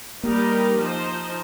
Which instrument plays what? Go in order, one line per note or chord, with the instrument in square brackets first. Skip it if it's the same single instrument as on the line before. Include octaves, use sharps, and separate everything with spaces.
[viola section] G3 D#4 G4 A#4 [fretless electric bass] A#3
[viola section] F3 D#4 C5